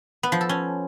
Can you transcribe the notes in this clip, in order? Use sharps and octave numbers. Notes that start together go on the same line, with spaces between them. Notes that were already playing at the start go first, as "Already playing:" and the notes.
B3
F3
A4
C#4